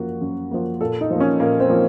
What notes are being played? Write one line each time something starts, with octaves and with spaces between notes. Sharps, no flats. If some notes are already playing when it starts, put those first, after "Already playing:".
Already playing: F#2 F3 A#3 F#4
F#2
F3 A#3
A#2 A4
D#4
F3 A#3
C#4
A#2 A#3
C4
F3 A#3